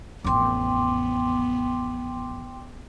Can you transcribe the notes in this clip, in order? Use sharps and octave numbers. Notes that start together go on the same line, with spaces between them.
A1 F2 B3 G5 C6 D6